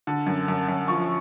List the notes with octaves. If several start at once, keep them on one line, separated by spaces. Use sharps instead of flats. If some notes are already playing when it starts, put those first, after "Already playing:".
D3
F#2
F#2
F#2
F3 C#6